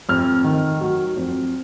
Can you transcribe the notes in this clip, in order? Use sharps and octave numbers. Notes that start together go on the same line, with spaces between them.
F2 F6
D#3
F#3
F2